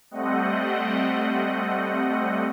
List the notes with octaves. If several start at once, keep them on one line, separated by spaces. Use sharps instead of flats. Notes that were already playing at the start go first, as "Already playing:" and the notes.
G3 A3 C4 D#5 F#5